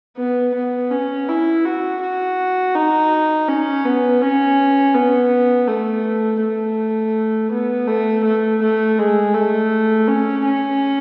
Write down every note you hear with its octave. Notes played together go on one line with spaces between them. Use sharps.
B3
B3
C#4
E4
F#4
F#4
D#4
C#4
B3
C#4
B3
A3
A3
B3
A3
A3
A3
G#3
A3
C#4
C#4